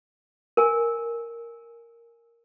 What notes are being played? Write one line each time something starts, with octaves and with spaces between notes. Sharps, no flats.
A#4 G#5